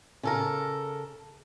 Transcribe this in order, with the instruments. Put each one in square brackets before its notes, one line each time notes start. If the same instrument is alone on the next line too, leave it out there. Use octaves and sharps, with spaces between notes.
[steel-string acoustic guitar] C#3 A4 A#4